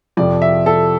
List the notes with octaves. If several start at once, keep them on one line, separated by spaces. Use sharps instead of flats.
F2 C3 F3 D5
E5
A4